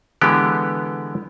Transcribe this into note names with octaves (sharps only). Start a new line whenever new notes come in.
D3 E3 G#3 B3 G4